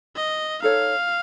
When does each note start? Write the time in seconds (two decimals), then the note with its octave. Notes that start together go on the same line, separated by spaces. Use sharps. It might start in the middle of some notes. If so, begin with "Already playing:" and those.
0.16 D#5
0.62 D#4 A4 C#5 F5